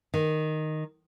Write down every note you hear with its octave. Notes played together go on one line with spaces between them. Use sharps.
D#3